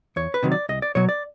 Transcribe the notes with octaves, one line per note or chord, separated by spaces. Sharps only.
E2 C#5
B4
C3 D#3 F#3
D5
C2 D#5
D5
B2 F#3 C#5
D5